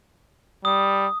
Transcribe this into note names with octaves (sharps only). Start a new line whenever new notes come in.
G3 D#6